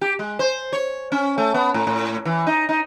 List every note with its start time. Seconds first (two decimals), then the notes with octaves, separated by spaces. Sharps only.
0.01 G4
0.19 G#3
0.39 C5
0.73 C#5
1.12 C#4
1.38 A3
1.54 B3
1.74 A2
1.87 A2
2.25 E3
2.47 D#4
2.69 D#4